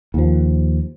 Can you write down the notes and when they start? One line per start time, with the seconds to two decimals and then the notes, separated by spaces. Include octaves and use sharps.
0.14 D#2 F3